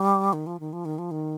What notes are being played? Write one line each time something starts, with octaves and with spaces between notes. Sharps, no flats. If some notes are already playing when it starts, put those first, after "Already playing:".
Already playing: G3
D#3
F3
D#3
F3
D#3
F3
D#3